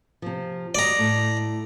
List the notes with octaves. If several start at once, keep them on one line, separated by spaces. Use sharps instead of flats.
C3 F3
F#4 G4 D5 D#5 A#5
A2